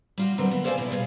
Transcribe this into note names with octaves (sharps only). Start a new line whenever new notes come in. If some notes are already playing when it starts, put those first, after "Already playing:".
G3 F4 F#4
D3 F#3 G3 C4 A#4 B4
B3
A4 C5 D5 F5 G5 G#5
B2 E4
B2 G3 G#4 F5